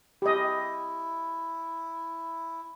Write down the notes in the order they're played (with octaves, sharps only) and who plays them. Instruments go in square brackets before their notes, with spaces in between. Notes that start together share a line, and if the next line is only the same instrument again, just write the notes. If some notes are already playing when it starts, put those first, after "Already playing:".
[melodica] E4 [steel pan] G4 D#5